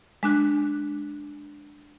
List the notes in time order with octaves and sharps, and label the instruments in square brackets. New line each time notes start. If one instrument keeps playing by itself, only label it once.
[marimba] G#3 D4 F#6